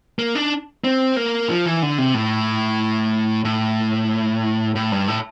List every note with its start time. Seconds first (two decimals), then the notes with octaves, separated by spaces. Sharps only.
0.19 A#3
0.35 D4
0.84 C4
1.17 A#3
1.50 F3
1.66 E3
1.82 D3
1.98 C3
2.14 A2
3.45 A2
4.75 A2
4.92 G2
5.08 A2